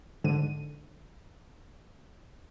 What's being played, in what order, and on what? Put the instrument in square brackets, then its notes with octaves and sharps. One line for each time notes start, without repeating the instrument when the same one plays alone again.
[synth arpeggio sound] G#2 D3 D#7